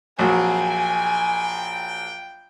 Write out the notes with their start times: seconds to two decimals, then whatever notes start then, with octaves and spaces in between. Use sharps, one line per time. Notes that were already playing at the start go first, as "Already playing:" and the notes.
0.19 A#1 F#3 C4 G#5
0.62 G5